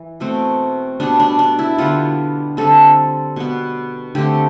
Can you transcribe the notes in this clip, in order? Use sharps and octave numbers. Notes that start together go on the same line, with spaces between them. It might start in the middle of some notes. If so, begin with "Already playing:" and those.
Already playing: E3
B2 A3 C4
B2 G3 B3 D4
D4
D4
E4
D3 G3 B3 F4
D3 G3 C4 A4
B2 B3
D3 A3 C4 G4